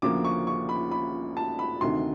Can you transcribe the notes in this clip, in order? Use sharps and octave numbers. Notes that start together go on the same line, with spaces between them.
D2 C#3 F3 A#3 D6
C#6
C#6
B5
B5
A5
B5
D2 C3 D#3 C6